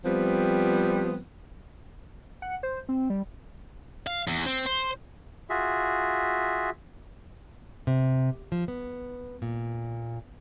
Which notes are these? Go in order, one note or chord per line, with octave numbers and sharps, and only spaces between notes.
F3 G3 B3 C4
F#5
C5
C4
G3
F5
E2
C4
C5
F4 F#4 G#4 E5
C3
F3
B3
A#2